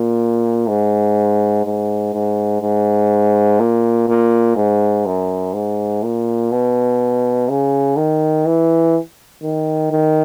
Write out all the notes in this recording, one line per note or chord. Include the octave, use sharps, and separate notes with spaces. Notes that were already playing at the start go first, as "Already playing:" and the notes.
Already playing: A#2
G#2
G#2
G#2
G#2
A#2
A#2
G#2
F#2
G#2
A#2
B2
C#3
D#3
E3
D#3
D#3